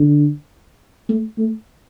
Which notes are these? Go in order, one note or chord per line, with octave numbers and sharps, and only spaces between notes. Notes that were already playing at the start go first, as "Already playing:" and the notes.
Already playing: D3
A3
A3